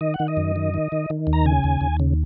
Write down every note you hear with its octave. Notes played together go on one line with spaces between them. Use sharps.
D#3 D#5
F#5
D#3
D#5
F#2
D#3
D#3
D#3
D#3
D#2
A#5
C#3 G#5
D#2
D#2
C#3